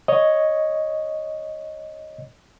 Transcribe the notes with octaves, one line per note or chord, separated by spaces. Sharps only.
C#5 D#5